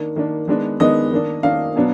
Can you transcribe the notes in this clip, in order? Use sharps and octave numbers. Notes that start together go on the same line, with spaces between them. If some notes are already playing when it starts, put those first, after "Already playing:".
Already playing: D#3 A#3 D4
D#3 A#3 D4
D#3 G#3 B3 D4
D#3 G#3 B3 D4 D#5
D#3 A#3 D4
D#3 A#3 D4 F5
B2 F#3 B3 D4